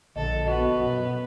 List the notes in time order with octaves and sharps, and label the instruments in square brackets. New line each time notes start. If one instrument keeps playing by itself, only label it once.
[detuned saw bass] A#1 [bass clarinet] D3 [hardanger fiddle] A4 [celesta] D#5
[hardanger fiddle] B3 [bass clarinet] F#4 [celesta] D#5
[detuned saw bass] F#2 [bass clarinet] B2